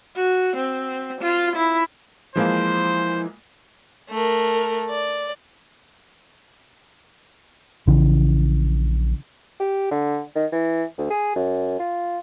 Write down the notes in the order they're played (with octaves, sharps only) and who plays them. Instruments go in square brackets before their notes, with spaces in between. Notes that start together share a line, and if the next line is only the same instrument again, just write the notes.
[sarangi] F#4
C4
F4
E4
[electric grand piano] E3 G#3 A#3 [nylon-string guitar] F3 E4 F5 [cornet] C5
[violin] A3 A#4
D5
[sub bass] A#1 [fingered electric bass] C#3 E3
[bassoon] G4
D3
D#3
E3
D2
G#4
F#2
F4